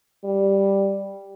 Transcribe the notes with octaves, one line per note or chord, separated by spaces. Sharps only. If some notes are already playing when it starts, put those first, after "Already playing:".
G3